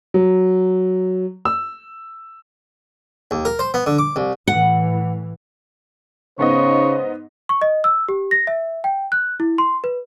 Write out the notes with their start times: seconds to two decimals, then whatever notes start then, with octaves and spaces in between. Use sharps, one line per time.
0.14 F#3
1.45 E6
3.31 D#2
3.45 A#4
3.59 C5
3.74 B3
3.86 D3
3.98 D6
4.16 C2
4.47 A2 E3 F#5
6.39 G#2 C#3 B3 C5 C#5 D#5
7.49 C#6
7.62 D#5
7.84 E6
8.09 G4
8.31 A#6
8.47 E5
8.84 G5
9.12 F#6
9.40 E4
9.58 C6
9.84 B4